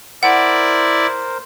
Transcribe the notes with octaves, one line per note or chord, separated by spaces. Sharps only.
E4 A#4 C5 D5 F#5